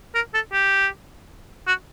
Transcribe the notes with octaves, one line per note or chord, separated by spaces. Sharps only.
A#4
A4
G4
F#4